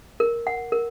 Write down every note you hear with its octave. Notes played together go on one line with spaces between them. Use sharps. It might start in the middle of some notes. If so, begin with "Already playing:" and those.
A#4
F#5
A#4